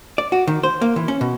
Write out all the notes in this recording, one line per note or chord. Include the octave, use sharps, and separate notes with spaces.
D5
F#4
D#3
C5
A#3
E3
C#4
B2